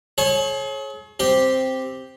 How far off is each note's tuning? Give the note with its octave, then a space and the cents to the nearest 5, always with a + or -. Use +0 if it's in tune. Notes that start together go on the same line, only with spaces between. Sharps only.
G#4 +40 C#5 -25
C4 +0 G4 +0